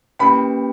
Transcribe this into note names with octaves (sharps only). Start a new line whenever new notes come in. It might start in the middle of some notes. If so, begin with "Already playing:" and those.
A#3 C#4 G4 B4 G5 B5